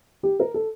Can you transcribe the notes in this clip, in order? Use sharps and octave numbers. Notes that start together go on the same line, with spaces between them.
G4
A#4
A4